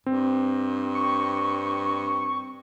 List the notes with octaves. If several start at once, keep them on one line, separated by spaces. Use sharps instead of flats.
G2 C4
C#6